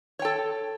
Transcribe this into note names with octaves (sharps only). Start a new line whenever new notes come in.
A4 C#5 G5